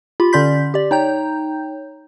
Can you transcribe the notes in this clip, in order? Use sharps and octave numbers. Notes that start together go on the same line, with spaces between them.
F4 G4 B5
D3 C#4 D5 C6 G6 B6
G4 D5
D#4 C#5 G5 A#5 G6